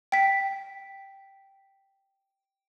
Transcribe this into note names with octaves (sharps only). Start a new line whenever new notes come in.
G5 B6